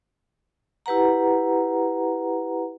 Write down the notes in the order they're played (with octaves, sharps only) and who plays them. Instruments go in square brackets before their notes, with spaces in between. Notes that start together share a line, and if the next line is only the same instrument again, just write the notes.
[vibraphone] E4 G4 B4 F#5 A#5